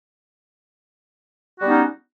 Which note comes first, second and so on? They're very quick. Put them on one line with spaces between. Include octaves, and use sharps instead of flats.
F#4 G3 B3 D#4 C#4